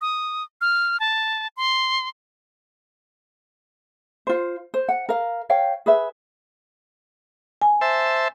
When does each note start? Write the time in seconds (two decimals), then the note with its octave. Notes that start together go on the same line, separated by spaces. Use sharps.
0.01 D#6
0.61 F6
1.00 A5
1.57 C6
4.27 F4 C5
4.74 C5
4.89 F#5
5.09 A#4 F5
5.49 C#5 F5 G5
5.86 G#4 B4 E5
7.62 G#5
7.81 C5 E5 A5